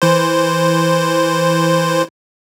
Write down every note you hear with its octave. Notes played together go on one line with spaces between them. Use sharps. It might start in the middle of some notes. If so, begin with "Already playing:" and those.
E3 C5